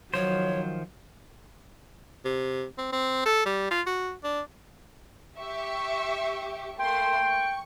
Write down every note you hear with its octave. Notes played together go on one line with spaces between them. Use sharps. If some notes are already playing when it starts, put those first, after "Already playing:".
D#3 F3 F#3 C5 C#5
C3
C4
C4
A4
G3
F4
F#4
D4
G4 E5 C#6
A3 A#3 G5 C6
C#6